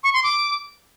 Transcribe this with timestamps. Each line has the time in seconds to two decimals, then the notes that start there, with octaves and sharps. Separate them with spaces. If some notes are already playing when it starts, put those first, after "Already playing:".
0.03 C#6
0.13 C6
0.23 D6